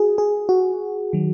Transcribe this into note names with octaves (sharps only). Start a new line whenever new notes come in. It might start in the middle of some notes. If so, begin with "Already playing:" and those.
Already playing: F#4 G#4
G#4
F#4
D#3 F#3